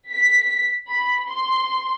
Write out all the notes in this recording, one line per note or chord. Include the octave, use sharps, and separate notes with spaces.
B6
B5
C6